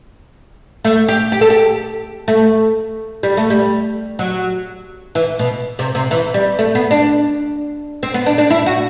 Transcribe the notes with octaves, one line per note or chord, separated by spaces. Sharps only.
A3
G4
G4
A4
G4
A3
G3
A3
G3
F#3
E3
B2
C3
C3
E3
G3
A3
B3
D4
C4
B3
D4
D4
E4
F#4